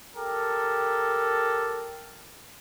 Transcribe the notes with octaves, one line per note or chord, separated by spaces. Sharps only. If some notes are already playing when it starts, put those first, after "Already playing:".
G4 A4 A#4